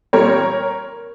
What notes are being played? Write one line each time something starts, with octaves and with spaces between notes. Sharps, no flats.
A#2 G3 C4 A#4 C#5